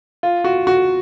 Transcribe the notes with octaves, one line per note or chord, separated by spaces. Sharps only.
F4
F#4
F#4